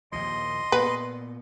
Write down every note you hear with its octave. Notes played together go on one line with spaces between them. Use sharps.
A#1 D#2 F3 D#5 C6
A#2 B3 B4